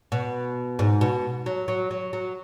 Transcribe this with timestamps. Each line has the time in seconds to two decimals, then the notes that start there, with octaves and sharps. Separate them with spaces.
0.12 B2
0.79 G#2
1.01 B2
1.46 F#3
1.68 F#3
1.91 F#3
2.13 F#3